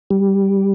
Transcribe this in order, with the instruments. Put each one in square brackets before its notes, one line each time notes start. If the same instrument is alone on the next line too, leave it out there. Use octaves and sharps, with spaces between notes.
[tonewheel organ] G3